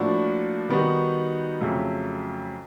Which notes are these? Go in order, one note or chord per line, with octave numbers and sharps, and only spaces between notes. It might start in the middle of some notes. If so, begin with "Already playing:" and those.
Already playing: A2 F3 A#3 D4 F#4
D#3 G3 B3 D#4 F#4
F2 C#3 F#3 A3